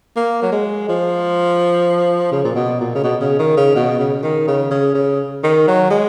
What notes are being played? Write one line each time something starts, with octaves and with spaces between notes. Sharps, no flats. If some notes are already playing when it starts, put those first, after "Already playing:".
A#3
F#3
G#3
F3
C#3
A#2
B2
A#2
C#3
B2
C#3
D#3
C#3
B2
C#3
D#3
C#3
C#3
C#3
D#3
F#3
G#3